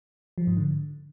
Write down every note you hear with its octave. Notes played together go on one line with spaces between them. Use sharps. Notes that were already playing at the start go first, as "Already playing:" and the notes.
F3
G#2
D3